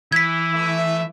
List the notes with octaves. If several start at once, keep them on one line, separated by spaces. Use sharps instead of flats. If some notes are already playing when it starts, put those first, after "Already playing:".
E3 E4 G#6 B6
A3 E5